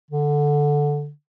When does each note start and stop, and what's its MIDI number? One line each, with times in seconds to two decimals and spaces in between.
0.11 1.10 50